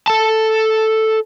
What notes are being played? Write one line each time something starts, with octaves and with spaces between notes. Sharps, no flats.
A4 A5